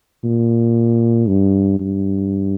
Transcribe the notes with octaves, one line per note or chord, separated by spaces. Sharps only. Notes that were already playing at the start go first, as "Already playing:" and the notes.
A#2
G2
G2